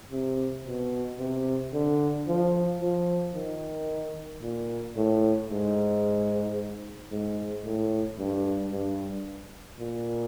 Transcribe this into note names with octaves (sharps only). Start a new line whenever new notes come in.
C3
B2
C3
D3
F3
F3
D#3
A#2
A2
G#2
G#2
A2
G2
G2
A#2